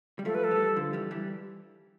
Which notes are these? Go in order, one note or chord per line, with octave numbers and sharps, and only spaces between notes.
G3
F3 A3 A4
B4
A4
E3 G3
D3 F3
E3 G3
E3 G3